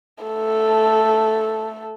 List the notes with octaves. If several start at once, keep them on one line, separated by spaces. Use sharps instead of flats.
A3 A4